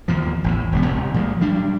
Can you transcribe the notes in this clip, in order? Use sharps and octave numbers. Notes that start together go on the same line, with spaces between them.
D#2 A#2 F3
A1 E2 A2
E1 C#2 B3
C2 C3
A#2 F3 F#3 G#3
F#3 G3 D4